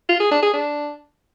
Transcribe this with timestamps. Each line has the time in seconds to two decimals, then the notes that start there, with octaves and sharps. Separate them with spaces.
0.09 F4
0.20 G#4
0.31 D4
0.43 G#4
0.54 D4